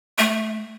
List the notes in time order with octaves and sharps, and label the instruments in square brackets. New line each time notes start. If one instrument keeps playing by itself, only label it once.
[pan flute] A3